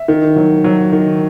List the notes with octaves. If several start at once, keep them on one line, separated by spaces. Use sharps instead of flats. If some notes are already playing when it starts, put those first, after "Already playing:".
Already playing: E5
D#3
F#3
F#3
D#3